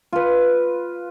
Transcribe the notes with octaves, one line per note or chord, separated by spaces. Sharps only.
F4 B4